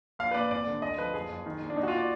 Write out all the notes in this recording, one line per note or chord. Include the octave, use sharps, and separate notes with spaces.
A#1 F5
B4
A#2 D5
G#1 D5
D3
D2 D#5
F3 B4
F#1 G#4
F#1
D#3
A#1
D4
A#2 D#4
F#4
F4
A#2
D5